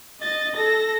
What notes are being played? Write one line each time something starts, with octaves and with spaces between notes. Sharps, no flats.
D#5 A6
A4 A#6